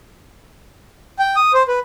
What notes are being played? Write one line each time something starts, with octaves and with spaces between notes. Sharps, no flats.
G5
D#6
C5
B4